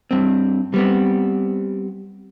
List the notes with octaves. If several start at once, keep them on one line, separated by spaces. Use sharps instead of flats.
G2 C4
G3 B3 C4